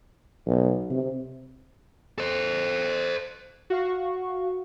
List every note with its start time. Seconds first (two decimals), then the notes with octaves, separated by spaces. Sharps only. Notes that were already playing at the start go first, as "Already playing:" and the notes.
0.46 B1
0.90 C3
2.18 A4 C5
3.70 F#4 F5 C#6